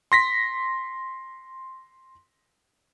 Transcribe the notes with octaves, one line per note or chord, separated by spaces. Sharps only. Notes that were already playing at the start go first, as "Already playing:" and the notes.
C6 A#6 B6